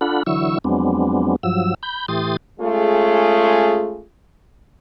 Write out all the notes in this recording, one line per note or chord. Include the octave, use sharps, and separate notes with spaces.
D4 F4 A4 F#5 B5
D3 E3 F#3 E4 C#6 E6
F2 F#3 G#3 B3 C4 D4
G2 F3 F#3 E6
B5 G6
A2 E3 G4 C6 D#6 A6
G#3 A3 C#4 F4 G#4